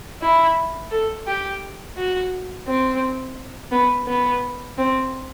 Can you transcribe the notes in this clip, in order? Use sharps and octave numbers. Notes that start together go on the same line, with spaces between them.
E4
A4
G4
F#4
C4
B3
B3
C4